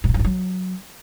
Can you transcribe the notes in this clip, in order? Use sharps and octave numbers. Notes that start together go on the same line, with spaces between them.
A2
C3
G2
G#2
F#3